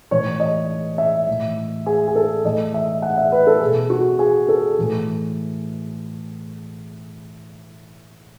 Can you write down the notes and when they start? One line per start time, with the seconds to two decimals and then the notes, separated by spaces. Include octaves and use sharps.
0.11 A2 E3 C#5
0.40 D#5
0.98 E5
1.28 A2 E3
1.86 G#4
2.08 G#4
2.15 A4
2.44 A2 E3 D#5
2.74 E5
3.02 F#5
3.17 E5
3.32 B4
3.47 A4
3.61 B2 G#4
3.90 F#4
4.19 G#4
4.49 A4
4.79 A2 E3